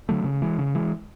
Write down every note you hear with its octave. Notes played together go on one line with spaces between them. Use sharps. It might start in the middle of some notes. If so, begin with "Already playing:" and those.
D3 F#3 A3
C#3
E3 G#3
C#3
E3 G#3